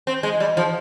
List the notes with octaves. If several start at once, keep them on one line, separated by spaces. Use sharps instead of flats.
C4
G#3
G3
F3